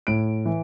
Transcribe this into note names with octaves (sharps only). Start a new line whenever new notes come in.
A2 D7
E3